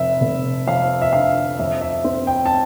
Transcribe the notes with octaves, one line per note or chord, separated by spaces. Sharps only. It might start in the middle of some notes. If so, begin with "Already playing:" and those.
Already playing: F1 E5
F1
F2 F5
E5
D3 F5
F2 E5
E5
C4
G5
A5